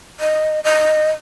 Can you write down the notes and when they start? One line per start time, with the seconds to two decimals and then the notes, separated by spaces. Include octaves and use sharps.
0.20 D#5
0.64 D#5